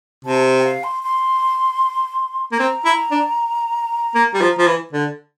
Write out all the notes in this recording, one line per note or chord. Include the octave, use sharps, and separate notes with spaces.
C3 A5
G5
F5
C6
C6
A#3
C4 A#5
E4
D4
A#3
G3
F3
F3
E3
D3